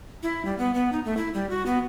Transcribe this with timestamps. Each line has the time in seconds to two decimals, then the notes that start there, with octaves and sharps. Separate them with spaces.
0.23 E4
0.45 G3
0.58 B3
0.74 B3
0.92 D#4
1.05 A3
1.17 E4
1.34 G3
1.50 F#4
1.66 B3